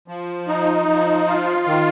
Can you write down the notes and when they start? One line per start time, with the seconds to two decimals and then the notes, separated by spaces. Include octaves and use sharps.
0.08 F3
0.48 D#4
0.87 F3
1.27 F4
1.67 D#3